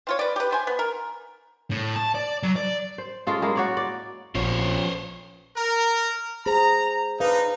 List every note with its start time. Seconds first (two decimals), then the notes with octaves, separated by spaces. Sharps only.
0.07 C4 F4 C#5
0.19 B4 D5
0.36 G4 B4
0.51 B3 C5 G#5
0.67 B3
0.79 A#4
1.71 A2
1.96 A5
2.15 D5
2.43 F#3
2.56 D5
2.98 C5
3.27 G#3 C#4 F4 A4
3.42 G#3 A#3 E4
3.56 F#4 C#5 D5
3.77 D5
4.35 A#1 F3 C#4 C5 C#5
5.57 A#4
6.46 G#4 C5 A#5
7.20 D4 D#4 B4 F5